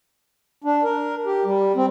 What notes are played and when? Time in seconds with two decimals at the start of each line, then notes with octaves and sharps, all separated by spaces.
0.64 D4
0.84 A#4
1.26 G4
1.45 G3
1.76 C4